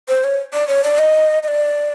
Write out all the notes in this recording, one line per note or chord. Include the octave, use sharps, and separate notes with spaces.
C5
C#5
D5
C#5
D5
D#5
D#5
D5